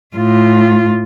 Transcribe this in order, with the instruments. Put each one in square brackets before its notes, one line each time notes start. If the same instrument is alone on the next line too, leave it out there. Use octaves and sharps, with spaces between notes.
[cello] A2 F4